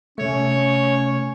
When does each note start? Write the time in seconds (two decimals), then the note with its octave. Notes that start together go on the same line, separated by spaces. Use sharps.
0.18 C3 A3 C#4 C#5